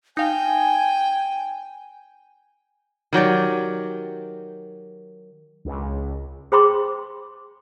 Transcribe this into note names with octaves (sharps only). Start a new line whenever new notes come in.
D#4 F5 G5 G#5
D#3 F#3 G4 D5
C#2
G#4 C5 G5 B5 C6 D6